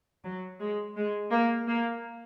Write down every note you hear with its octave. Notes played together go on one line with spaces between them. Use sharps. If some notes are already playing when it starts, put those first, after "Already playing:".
F#3
G#3
G#3
A#3
A#3